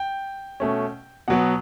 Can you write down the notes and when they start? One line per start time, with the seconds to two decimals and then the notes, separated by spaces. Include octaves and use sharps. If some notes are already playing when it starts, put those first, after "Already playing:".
Already playing: G5
0.60 B2 A3 C#4
1.28 B2 F#3 B3 F#5